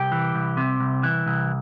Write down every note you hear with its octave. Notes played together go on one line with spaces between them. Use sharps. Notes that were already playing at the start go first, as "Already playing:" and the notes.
Already playing: C2 G4
E3
C2
C3
C2
E3
C2